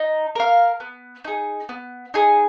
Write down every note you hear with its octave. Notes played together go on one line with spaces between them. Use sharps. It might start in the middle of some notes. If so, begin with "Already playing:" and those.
Already playing: D#4
A#4 F5
B3
D#4 G#4
B3
D#4 G#4